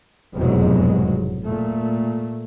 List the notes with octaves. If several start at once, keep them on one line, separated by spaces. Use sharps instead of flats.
F1 E2 G#2 B2 F#3 G#3
A#2 A3